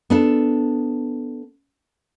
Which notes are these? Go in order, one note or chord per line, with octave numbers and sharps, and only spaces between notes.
B3 D4 A4